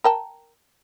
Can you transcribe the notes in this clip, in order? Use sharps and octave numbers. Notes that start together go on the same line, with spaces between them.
A#4 G5 A5